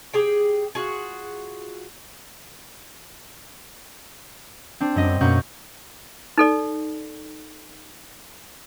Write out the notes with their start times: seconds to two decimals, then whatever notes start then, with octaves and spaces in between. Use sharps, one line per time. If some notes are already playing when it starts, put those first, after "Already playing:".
0.13 G4 G#4 G5
0.75 F4 F#4 G#4
4.80 C4 D4
4.96 F#2 G3 D#5
5.21 F#2 B2 A#3 F#5 C#6 G6
6.38 D#4 A4 D5